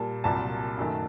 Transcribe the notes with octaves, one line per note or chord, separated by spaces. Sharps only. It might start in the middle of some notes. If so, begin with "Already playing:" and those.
Already playing: A#2 G3 A#3 A5
C2 A#2 F#3 A#3 A5
F#2 D#3 A3